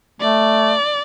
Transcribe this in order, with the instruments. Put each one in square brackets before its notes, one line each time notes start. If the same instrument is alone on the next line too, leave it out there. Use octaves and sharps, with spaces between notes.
[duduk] A3 [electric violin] D5